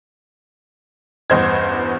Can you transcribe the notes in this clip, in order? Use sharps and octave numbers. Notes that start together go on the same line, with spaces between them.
A1 E2 G2 C5 D#5 G#6